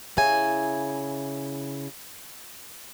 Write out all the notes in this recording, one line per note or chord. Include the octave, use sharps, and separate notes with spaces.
C#3 E4 G#5